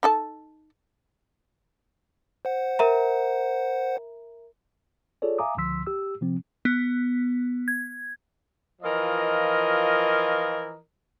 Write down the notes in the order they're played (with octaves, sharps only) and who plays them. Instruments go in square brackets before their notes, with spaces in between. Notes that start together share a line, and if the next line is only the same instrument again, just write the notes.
[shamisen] D#4 A4 A5
[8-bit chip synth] C5 F#5
[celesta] A#4 E5 A#5
[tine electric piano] F4 G#4 A4 C#5 D5
E5 F5 G#5 A#5 D6 D#6
C#2 D3 F3 C6 E6 B6
G4 E6
C3 F3 C4
[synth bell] B3
G#6
[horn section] E3 F3 F4 A#4 D#5